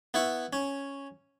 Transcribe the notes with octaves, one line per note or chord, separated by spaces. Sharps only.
B3 E4 C#6
C#4